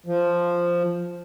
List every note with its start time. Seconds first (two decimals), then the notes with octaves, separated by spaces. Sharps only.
0.06 F3